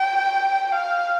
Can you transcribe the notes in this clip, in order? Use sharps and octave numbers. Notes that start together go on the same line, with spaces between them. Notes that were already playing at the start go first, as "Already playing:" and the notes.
Already playing: G5
F5